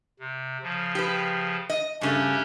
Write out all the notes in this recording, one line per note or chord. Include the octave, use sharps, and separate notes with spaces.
C3
C#3 F3
G4 B4
D#5
G2 C#3 A3 C#4 D4 G4